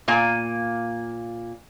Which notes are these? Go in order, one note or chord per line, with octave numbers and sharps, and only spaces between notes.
A#2 A#3 G#5